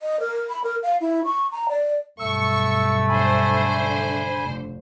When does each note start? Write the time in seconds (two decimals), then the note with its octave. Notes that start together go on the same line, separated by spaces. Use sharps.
0.01 D#5
0.20 A#4
0.50 B5
0.64 A#4
0.83 F5
1.01 E4
1.25 C#6
1.52 A#5
1.69 D5
2.20 B1 G2 A3 C#6 E6
3.09 D3 C5 G#5 B5
4.44 F1